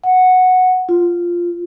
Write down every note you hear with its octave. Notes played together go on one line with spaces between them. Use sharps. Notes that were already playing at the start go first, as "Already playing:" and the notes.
F#5
F4